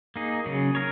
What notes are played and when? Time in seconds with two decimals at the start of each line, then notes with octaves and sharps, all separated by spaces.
0.16 A#3 D#4 G#4
0.46 C#3 F#3 C#4 G#4
0.75 A#4 C#5